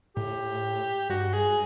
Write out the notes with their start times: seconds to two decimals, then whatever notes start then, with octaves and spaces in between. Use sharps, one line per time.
0.16 A2 G4
1.10 G2 F#4
1.33 G#4